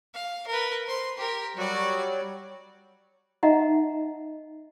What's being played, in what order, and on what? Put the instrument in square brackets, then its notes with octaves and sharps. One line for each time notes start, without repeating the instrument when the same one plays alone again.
[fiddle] F5
A#4 B4
C5 C6
G4 A#4
[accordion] F#3 G3 [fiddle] F#4 D5
[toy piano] D#4 D#5 E5 F#5 A#5